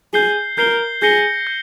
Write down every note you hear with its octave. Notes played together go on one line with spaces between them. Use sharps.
G#4 G6 C7 G7
A#4 G6 C7 G7
G#4 G6 A#6 C#7 G7
G6